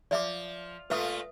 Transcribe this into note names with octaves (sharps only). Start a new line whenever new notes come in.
F3 D5 E5 D6
A#2 A3 F4 B4 E5 D#6